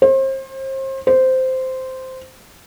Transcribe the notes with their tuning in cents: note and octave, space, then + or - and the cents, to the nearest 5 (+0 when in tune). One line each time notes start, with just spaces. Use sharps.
C5 +35
C5 -10